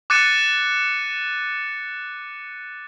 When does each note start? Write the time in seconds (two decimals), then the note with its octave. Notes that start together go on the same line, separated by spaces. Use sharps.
0.10 D6 F#6 A6 C#7 D#7